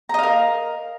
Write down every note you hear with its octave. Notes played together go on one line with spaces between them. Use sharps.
A#4 D#5 F5 A#5